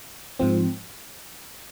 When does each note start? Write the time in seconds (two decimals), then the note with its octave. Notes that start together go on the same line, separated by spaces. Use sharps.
0.39 G#2 F3 C4